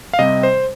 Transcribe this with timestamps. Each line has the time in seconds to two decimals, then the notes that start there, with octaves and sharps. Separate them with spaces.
0.13 F5
0.19 C3 G3 C4 D#5
0.43 C5